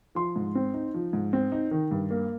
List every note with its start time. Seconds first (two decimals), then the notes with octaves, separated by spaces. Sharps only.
0.15 F3 C6
0.36 G#2
0.55 C4
0.74 D#4
0.94 F3
1.13 G#2
1.33 C4
1.52 D#4
1.71 D#3
1.91 G2
2.11 A#3